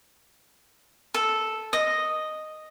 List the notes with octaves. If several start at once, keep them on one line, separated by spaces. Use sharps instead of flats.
A4
D#5